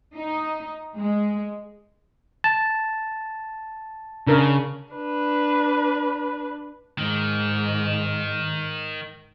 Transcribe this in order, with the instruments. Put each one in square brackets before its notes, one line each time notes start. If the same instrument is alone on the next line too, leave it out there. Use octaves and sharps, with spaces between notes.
[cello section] D#4
G#3
[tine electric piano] A5
[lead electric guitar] C#3 [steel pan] D4 A#4
[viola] D4 B4
[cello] G#2 [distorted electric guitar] D#3